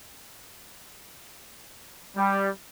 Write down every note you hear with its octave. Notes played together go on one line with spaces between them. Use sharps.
G3